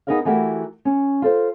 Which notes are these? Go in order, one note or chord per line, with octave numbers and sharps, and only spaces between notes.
B3 D#4 G#4 A#4 D5 F5
E3 A3 E4 F#4 G4 A#4
C#4
F4 A4 C5